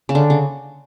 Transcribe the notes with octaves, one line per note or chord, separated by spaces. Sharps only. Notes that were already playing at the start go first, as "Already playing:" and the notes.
C#3
D3
C#3